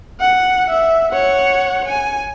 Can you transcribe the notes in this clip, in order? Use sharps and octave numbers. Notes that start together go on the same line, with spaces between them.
F#5
E5
C#5 F#5
G#5